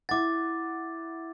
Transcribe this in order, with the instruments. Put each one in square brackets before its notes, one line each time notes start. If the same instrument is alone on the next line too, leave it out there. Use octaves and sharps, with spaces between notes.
[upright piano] E4 F#5 [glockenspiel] D6 A6